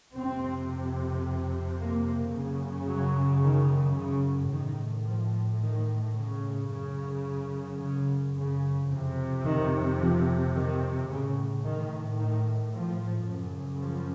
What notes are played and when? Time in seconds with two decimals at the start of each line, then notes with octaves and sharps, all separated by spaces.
0.14 F2 C3 C4
1.78 A#3
2.33 F#2 C#3
2.88 F#3
3.42 D#3
3.97 C#3
4.51 A2 D#3
5.06 F3
5.61 D#3
6.16 C#3
6.71 F#2 C#3
7.81 C#3
8.35 C#3
8.90 F2 C3
9.44 D#3
10.00 F3
10.55 D#3
11.09 A2 C#3
11.64 D#3
12.18 D#3
12.74 F3
13.28 F#2 C#3
13.82 F3